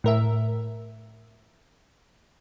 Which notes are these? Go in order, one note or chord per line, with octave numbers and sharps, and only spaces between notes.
A2 A#4 E5